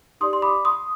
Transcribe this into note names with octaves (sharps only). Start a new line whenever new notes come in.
D#4 G4 D5 C6 D#6
C6
B5 D6
C6 D#6